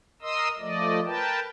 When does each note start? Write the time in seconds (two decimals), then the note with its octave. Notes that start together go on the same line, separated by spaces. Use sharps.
0.22 A#4 D#5 C6 D#6 E6
0.59 F3 A3 D5 D#5
1.05 A#4 B4 G5 A5